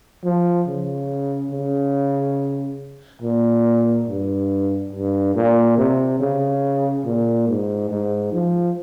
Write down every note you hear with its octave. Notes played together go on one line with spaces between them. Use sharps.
F3
C#3
C#3
A#2
G2
G2
A#2
C3
C#3
A#2
G#2
G#2
F3